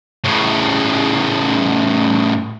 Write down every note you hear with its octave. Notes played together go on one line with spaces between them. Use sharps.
A2 C#3